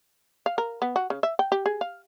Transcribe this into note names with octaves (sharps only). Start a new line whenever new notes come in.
F5
A#4
B3
F#4
C#3
E5
G5
G4
G#4
F5